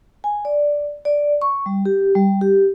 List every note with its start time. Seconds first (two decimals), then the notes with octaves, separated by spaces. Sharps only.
0.24 G#5
0.45 D5
1.05 D5
1.42 C#6
1.66 G3
1.85 G4
2.15 G3
2.41 G4